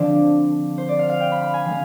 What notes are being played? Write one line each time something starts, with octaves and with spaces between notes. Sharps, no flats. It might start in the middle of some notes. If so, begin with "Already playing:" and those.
Already playing: D3 F3 C4 D4
C5
D5
F5
F5
G5
B5
B5
G#5
F3 G#3 C4 F5